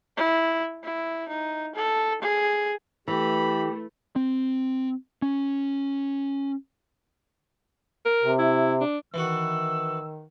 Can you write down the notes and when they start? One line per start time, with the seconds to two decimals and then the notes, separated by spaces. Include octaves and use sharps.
0.17 E4
0.83 E4
1.29 D#4
1.75 A4
2.22 G#4
3.08 E3 A3 G4 B5
4.16 C4
5.22 C#4
8.05 A#4
8.23 C3
8.39 E4
8.81 D4
9.14 D#3 E3 F#4 E6